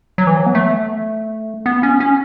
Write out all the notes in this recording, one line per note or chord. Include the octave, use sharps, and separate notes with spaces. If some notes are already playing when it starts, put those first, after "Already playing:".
F#3
E3
F#3
B3
A3
B3
C#4
C#4